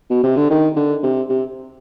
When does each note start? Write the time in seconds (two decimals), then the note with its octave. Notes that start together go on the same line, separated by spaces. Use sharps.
0.10 B2
0.23 C3
0.37 D3
0.50 D#3
0.76 D3
1.03 C3
1.29 C3